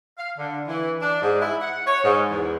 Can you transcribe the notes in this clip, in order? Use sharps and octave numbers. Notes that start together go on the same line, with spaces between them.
F5
D3
E3
D4
G#2
E4
F#5
C#5
G#2
E2